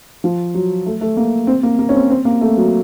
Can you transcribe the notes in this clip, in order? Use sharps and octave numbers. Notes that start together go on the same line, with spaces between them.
F3
F#3
A3
A3
A#3
C4
A#3
A#3
C#4
C4
C4
A#3
A3
F#3